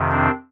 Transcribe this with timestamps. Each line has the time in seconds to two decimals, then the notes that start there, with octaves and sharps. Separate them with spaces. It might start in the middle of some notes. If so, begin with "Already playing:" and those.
Already playing: F2 C3 D#3
0.11 C4 D4